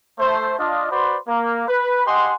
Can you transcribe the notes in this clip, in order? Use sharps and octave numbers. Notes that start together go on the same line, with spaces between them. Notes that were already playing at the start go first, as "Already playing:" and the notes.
A3 C5
D4 F4 D#5
F#4 B4 C5 D5 B5 C6
A#3
B4
G4 D#5 F#5 G#5 C6